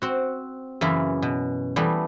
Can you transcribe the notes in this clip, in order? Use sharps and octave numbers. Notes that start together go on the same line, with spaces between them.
C4 F#4
F#2 C#3 E3 A#3 E4
B2
E3 G3 A3 B3